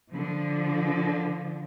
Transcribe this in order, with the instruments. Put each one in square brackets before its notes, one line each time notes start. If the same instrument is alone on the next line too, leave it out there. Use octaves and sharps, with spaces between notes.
[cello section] D3 F3